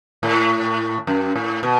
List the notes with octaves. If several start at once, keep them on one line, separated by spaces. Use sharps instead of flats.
A2
F#2
A2
B2